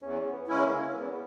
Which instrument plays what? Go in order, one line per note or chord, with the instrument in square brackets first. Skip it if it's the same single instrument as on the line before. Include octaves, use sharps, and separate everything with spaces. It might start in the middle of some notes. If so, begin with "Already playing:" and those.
[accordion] E2 [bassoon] C#4
[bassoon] B3
[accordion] C#3 G#3 C#4 E4
[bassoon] A#3
C#4
[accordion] E2 [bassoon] B3